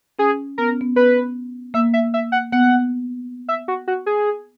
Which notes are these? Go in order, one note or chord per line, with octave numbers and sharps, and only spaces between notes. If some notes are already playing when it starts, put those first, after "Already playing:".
C#4 G#4
B3 A#4
C#4
B3
B3 B4
A#3 E5
E5
E5
F#5
B3 F#5
E5
F#4
F#4
G#4